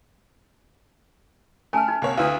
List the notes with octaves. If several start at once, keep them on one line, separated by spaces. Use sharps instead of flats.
A3 C#4 G#5 A5 F6
D#4
C2 A#3 C#5
D2 D4 E4 B4 F5 D#6